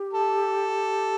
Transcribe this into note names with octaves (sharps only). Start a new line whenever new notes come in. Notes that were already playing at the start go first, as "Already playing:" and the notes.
Already playing: G4
A4